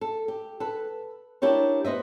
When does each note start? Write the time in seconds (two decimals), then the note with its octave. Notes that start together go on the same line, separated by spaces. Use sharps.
0.01 A4
0.28 G4
0.60 A4 B4
1.42 D4 E4 G4 A#4 C#5
1.84 B3 C5 D#5 E5